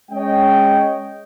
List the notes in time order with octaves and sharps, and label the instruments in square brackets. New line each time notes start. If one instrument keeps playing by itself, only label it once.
[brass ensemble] G#3 C#4 C#5 D#5 G5